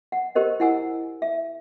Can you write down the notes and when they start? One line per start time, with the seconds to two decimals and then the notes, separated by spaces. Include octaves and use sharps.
0.12 F#5
0.35 G4 A#4 C5 D#5
0.60 E4 F#5 G#5 E6
1.22 E5